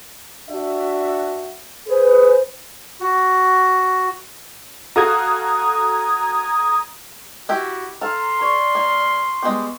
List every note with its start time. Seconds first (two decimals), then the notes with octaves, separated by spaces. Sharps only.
0.50 D4 F#4 E5
1.88 G#4 B4 C5
3.00 F#4
4.96 F#4 A4 F5 A#5 D#6 G#6
7.49 E4 F#4 G4
8.01 A4 F5 A#5 C6
8.41 C#5 D5
8.75 A#3
9.43 G3 G#3 B3